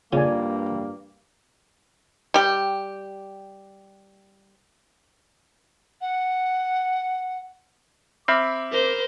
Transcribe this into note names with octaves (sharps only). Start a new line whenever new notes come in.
G2 C#3 A#3 F4 D5 G#5
G3 G4
F#5
C4 E5 B5 D6 F6
A#4 C5